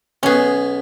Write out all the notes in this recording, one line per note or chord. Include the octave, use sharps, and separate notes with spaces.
B1 B3 C#4 G#4